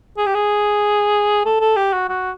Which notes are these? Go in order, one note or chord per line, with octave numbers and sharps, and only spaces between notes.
G#4
G4
G#4
A4
A4
G4
F#4
F#4